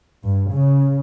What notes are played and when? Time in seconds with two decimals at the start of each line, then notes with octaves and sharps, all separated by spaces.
0.24 G2
0.52 C#3